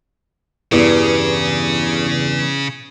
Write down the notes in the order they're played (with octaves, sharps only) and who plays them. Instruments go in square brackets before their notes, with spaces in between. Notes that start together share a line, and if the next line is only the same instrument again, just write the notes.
[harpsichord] E2 G2 [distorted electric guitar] C#3